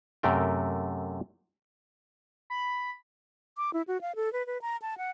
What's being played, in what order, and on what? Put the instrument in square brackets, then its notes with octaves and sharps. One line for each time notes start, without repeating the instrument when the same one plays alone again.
[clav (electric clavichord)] F#2 C3 A3 A#4 G5
[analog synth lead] B5
[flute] D6
E4
F#4
F5
A4
B4
B4
A#5
A5
F#5